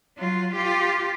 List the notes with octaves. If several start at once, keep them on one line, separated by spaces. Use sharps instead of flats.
F#3 F4
F4 G4